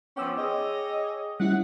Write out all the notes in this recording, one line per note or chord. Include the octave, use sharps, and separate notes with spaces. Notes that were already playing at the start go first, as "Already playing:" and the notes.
F3 B3 C#4 G5 D6 E6
G#4 C#5 D#5
G3 C#4 E4 F#5